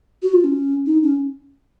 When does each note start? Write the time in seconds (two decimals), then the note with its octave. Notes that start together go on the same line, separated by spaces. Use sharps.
0.23 F#4
0.33 F4
0.44 C#4
0.86 D#4
1.03 C#4